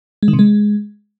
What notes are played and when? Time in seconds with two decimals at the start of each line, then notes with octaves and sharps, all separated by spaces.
0.23 G#3
0.28 D#3
0.33 C3
0.39 G#3